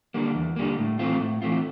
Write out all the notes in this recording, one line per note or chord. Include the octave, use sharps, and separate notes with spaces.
D3 G3 A#3
E2
D3 G3 A#3
A2
E3 A3 C4 F4
A2
E3 A3 C4 F4